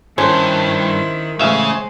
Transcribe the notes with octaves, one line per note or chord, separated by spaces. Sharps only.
G2 D#3 C#4 E4 C5
A1 C#3 G#3 E5 F5